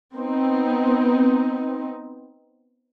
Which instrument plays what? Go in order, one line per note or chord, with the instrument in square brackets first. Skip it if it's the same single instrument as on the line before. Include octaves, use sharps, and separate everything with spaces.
[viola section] B3 C4 D#4